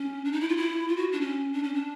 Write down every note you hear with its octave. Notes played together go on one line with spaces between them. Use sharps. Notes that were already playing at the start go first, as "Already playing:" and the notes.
Already playing: C#4
D4
D#4
E4
F4
E4
F4
F#4
D4
C#4
D4
C#4
D4